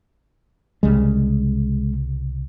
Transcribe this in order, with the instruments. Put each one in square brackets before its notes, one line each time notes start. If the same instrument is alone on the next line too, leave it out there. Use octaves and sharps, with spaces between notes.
[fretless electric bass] C2 C#3 G3 [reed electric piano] G#3